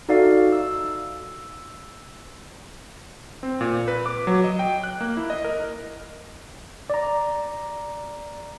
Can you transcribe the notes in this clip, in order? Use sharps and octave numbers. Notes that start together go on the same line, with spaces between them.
D#4 F#4 A4 D5 E5 F5
E6
C4
A#2
B4
D6
F#3
D#5
G5
F#6
A#3
E4
D#5
A#4
D5 A#5